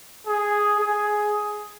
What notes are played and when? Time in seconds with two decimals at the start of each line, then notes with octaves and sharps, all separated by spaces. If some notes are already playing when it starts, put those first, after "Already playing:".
0.27 G#4
0.80 G#4